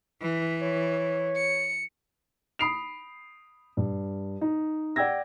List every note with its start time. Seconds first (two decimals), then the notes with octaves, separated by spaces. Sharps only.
0.21 E3
0.61 C#5
1.36 C#7
2.59 B5 D#6 C7 D7 F7
3.77 G2
4.41 D#4
4.96 D5 F#5 G5 E6 G#6 A#6